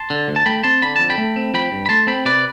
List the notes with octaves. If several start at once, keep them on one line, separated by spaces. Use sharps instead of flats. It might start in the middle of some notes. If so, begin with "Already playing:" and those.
Already playing: A5 C6
D3
D2
A5
A3 G5 B5
C4 A5 C6
D3 B5
F2 A5
G5 B5
A3
C4
F3 G5 B5
G2
B5
A3 A5 C6
C4 G5 B5
C3 B4 D5